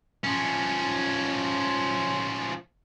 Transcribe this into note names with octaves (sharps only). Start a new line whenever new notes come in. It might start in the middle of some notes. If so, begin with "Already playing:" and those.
F3 C#4